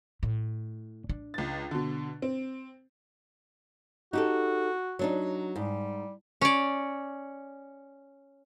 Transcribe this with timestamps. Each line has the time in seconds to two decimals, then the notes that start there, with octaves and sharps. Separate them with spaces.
0.23 A2
1.09 D4
1.34 C#2 A6
1.71 B2 D3
2.22 C4
4.13 D#4 F#4 G4 A4
4.99 F#3 D4 D#4
5.56 G#2 G3
6.41 C#4 D5